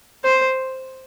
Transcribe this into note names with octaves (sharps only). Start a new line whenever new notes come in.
C5